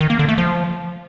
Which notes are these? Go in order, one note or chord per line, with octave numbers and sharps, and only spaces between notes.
D#3
A#3
D3
A3
F3